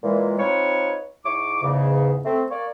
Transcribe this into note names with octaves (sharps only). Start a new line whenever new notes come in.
A#2 E3 G#3
C4 D#4 F4 B4 C#5
G#2 E4 C#6 D6
E2 G#2 C#3
A3 C4
A#3 C#5 D5